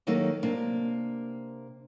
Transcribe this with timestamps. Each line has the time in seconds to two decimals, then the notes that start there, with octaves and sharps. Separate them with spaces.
0.07 D#3 F#3 A#3 D#4 G4 A4
0.43 C3 A#3 D4